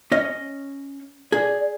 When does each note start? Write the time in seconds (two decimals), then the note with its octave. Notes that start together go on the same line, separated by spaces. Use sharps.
0.12 C#4 D#5
1.32 G#4 D5